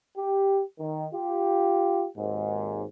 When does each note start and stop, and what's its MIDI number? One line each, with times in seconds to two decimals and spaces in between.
0.17 0.60 67
0.79 1.06 51
1.14 2.05 65
1.14 2.05 67
2.16 2.83 32
2.16 2.83 39
2.16 2.83 44